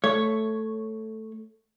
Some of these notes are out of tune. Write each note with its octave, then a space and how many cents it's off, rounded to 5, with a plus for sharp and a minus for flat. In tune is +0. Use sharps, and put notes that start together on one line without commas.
A3 +0 C#5 +0